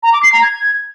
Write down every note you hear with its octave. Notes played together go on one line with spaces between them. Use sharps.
A#5
D6
C7
A#5
G#6